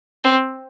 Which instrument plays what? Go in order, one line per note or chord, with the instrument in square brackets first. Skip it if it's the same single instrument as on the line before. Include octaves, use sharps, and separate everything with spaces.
[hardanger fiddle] C4